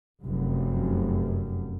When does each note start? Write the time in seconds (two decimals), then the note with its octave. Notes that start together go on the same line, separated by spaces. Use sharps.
0.22 F1 F#2